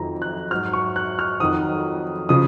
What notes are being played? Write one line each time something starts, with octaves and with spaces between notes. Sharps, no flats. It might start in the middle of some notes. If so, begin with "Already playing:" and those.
Already playing: F2 D#3 F#3 A#5
F#6
G#2 F#3 F6
C#6
F#6
F6
F2 D#3 F#3 D#6
C#3 F3 D#6